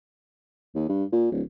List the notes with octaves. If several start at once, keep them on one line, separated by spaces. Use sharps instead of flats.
D#2
G2
A#2
D1